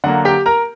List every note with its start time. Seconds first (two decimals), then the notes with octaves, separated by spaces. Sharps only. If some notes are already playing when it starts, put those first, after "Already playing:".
0.04 D3 F#3 A#3 F#5
0.25 G4 G5
0.46 A#4 A#5